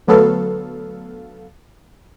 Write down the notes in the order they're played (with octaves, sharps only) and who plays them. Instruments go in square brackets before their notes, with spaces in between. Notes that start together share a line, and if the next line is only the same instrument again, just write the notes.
[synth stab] D2 F#3 B3 A4 F5